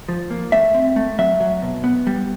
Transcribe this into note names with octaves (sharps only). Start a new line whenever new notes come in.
F3
A#3
A3 E5
C4
A3
F#3 E5
F#3
B2
B3
G3